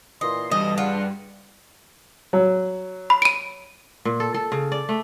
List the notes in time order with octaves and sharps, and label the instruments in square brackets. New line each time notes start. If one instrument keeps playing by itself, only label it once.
[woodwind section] A#2 E3 C6 [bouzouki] D#5
[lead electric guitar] G2 [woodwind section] B2 D3 E3 [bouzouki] D#5
[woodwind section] D4 G#4 F#5 [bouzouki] F4
[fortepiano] F#3
[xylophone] B5
D7 D#7
[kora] A#2
A4
A4
C#3
D5
A3